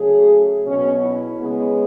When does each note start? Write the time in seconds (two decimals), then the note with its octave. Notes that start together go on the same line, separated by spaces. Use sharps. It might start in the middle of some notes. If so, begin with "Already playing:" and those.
Already playing: C#3 F#3 A3 G#4
0.66 B2 F#3 B3 C#4
1.03 E4
1.40 C#3 G#3 B3